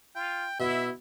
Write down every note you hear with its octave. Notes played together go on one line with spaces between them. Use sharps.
F4 G5
B2 E4 E5